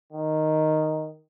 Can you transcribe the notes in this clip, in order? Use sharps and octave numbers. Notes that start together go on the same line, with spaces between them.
D#3